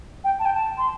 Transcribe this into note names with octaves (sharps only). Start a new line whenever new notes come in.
G5
A5
G5
A5
C6